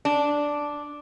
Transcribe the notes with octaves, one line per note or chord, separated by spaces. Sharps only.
D4